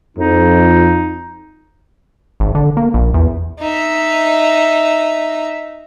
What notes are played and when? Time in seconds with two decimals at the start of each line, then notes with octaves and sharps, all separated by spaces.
0.17 F2 D#4
2.40 G#1
2.55 D3
2.77 A#3
2.94 A#1
3.14 E2
3.60 D#4 E5